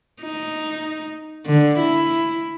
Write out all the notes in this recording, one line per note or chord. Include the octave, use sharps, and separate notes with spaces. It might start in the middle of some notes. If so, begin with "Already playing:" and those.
D#4
D3
E4